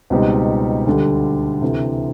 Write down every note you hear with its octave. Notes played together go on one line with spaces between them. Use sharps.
C#2 B2 G3 C4 D#4
D2 D3 G3
D2 C3 E3